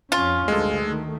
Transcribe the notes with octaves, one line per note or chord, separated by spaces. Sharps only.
F2 C#4 F4
D2 G2 G#3 A4
D#3 A3